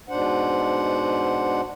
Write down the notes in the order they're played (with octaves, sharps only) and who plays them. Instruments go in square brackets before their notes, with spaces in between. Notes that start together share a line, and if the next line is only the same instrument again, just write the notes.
[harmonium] G#2 B2 D4 C5 F#5